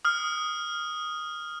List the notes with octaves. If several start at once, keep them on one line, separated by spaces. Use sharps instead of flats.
D#6 F6